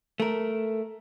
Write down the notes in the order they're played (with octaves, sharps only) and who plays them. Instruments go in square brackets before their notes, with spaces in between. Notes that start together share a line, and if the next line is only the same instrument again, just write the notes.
[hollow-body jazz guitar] A3 A#4